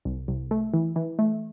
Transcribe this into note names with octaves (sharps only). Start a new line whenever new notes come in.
C2
C2
A3
E3
E3
A3